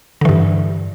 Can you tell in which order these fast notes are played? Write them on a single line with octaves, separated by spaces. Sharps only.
D3 E3 G2